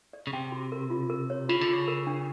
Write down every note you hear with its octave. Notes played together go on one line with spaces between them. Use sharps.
D5
C#3
C3 G5
F#4
A#4
F4
A#4
C#5
C#3 F4
D3
C#3 F4
A#4
D4